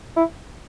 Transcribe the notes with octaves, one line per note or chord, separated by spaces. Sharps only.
E4